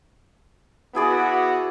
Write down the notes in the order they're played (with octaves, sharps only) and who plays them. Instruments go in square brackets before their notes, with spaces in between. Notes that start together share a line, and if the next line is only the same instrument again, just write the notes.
[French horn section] B3 F#4 [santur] E4 G#4 D5